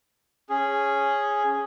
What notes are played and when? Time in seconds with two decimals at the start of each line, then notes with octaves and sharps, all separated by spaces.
0.49 C#4 G#4